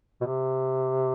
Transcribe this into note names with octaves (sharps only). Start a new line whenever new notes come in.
B2
C3